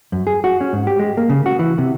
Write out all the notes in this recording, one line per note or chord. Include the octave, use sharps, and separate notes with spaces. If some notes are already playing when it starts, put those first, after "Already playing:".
F#2
G#4
F#4
C#4
G#2
G4
G#3
A#3
C#3
F#4
E3
C3